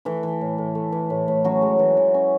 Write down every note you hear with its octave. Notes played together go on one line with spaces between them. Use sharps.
E3 A3 E4
E3
A2
A2
A3
E3
A2
A2
F#3 C#4 F#4
G#3
E3
E3
C#4